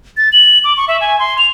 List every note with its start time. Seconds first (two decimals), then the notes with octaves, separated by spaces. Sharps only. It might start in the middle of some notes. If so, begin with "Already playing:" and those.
0.17 A6
0.33 F#7
0.64 D6
0.77 C#6
0.88 E5
1.01 G#5
1.19 C6
1.38 F7